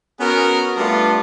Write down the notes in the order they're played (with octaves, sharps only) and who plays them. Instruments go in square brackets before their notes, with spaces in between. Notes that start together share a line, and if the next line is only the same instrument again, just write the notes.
[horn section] B3 C#4 F#4 G#4 A#4
G3 A3 B3 D4 F4